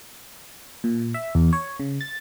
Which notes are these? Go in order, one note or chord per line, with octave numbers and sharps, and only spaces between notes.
A#2
E5
E2
C#5
C#3
A6